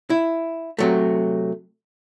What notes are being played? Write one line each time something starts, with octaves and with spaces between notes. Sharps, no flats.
E4
C3 F#3 A3